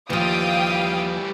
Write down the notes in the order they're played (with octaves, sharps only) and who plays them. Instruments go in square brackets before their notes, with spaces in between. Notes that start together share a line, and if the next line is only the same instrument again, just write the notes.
[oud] D#2 F3 [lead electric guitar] E3 G3 [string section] F5 G5 D#6